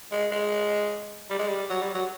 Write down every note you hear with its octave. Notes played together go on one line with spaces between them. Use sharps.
G#3
G#3
G3
G#3
G3
F#3
G3
F#3